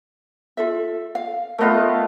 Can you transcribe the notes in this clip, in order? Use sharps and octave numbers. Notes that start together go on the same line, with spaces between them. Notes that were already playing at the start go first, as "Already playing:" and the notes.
F4 A4 E5
F5
A3 B3 F4 A#4 D#5